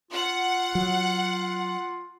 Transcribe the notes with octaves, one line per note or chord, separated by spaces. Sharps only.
F4 F#5
F#3